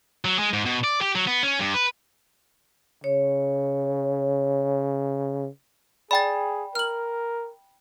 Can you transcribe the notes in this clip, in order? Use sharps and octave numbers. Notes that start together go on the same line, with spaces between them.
F#3
G#3
G#2
B2
D5
G4
F#3
B3
C#4
G2
B4
C#3 C#5
G#4 D5 G5 B5 A6
A#4 F6 F#7